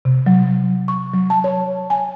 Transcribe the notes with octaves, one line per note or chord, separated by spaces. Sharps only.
C3
F#3
C#6
F#3
A5
C#5
G#5